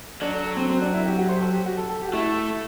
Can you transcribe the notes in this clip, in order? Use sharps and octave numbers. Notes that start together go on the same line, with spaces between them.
F#3 D4
A4
A4
C4
C4
D4
E4
G4
F#4
C5
G4
A4
G4
F#4
A4
A4
G4
F#4
A3 E4